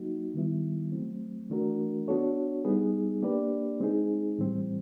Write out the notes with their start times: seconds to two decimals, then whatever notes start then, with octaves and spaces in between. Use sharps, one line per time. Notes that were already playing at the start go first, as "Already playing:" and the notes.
Already playing: F#3 A#3 D#4 F#4
0.34 D#3 G3 B3 E4
0.92 F#3 A3 C4
1.50 E3 A3 D4 F#4 A#4
2.08 B3 D4 F#4 A4 C#5
2.65 G3 B3 D#4 G#4
3.22 A#3 D4 G4 B4 D5
3.80 G#3 C4 D#4 G#4
4.38 A2 E3 G3 C4